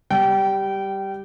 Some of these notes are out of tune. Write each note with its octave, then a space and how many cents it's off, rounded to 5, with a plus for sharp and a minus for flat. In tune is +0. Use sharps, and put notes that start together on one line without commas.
G3 +0 G5 -25